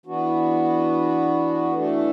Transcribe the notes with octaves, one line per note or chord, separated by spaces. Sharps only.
E3 B3 D4 F#4
E3 A3 D4 A4